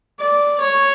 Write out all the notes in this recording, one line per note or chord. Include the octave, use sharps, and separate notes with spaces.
D5
C#5